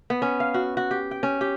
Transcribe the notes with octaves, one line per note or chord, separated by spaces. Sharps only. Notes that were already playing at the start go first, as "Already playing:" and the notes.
B3
C#4
F5
F#4
F#4
G4
G5
C#4
G4